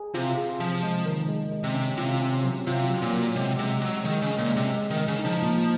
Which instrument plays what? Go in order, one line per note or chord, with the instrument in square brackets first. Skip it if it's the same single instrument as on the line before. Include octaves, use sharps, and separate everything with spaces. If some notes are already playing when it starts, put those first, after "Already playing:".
Already playing: [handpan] G#4
[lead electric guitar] C3 [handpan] F4
[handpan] G#4
[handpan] C3 [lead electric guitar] F3
[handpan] G#3
D#3
G#3
G#3
[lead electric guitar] C3
[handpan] C#4
[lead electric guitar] C3 [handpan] F4
[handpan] C#4
F#3
[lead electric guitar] C3 [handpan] F4
[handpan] F#3
[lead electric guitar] A#2
[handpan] F#3
[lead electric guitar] C3 [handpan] G#3
[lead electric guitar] C3 [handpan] G#3
[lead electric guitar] F#3 [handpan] G#3
[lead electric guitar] D#3 [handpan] G#3
[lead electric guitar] C#3
[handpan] C#4
[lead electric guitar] A#2
[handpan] G#3
[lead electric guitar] C3
[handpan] G#3
[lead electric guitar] D#3
[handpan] G#3
[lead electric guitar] C#3
[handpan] D#4
[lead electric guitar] F3
[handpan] A#2